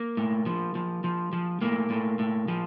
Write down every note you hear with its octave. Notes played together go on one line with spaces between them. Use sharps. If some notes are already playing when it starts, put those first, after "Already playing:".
Already playing: A#3
A2
F3
F3
F3
F3
A2 A#3
A2
A2
F3